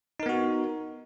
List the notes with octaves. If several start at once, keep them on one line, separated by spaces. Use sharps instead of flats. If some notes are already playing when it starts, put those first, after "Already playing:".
B3 D#4 F#4 A#4